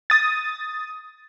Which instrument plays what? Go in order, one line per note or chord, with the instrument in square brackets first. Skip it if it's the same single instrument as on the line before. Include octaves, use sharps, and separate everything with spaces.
[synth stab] D#6 A6